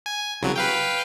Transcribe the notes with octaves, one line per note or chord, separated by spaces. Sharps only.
G#5
C2 C#3 F#3
B4 F5 G5